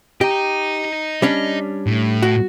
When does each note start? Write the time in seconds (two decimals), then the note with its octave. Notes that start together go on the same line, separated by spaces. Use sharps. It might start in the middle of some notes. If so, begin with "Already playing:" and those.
0.21 G4 D#5 A#5
1.22 G3 C#4 D4
1.87 A2
2.23 F#4